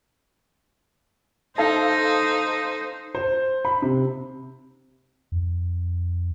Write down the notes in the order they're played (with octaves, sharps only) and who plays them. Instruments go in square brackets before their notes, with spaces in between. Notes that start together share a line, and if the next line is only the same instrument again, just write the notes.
[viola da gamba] D#4 [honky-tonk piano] A4 F5 [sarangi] C5
[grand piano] C5
B5
C3
[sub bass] F2